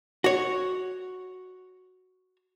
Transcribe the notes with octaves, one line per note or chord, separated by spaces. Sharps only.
F#4 C#5